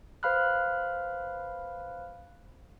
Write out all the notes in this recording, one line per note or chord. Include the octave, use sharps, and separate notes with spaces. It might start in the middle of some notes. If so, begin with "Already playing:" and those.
B4 C5 F5 B5 F6 F#6